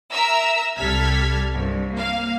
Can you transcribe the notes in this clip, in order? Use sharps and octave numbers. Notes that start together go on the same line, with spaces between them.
A#4 E5 A#5 E6
C2 G3 A4 F6 G#6 B6
C2 G2
A#3 F5